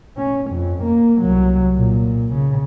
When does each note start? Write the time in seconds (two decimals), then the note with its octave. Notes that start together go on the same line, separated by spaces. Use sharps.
0.17 C#4
0.51 F2
0.83 A#3
1.21 C2 F#3
1.76 A#2
2.33 C#3